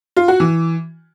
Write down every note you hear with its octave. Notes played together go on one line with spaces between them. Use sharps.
F4
F#4
E3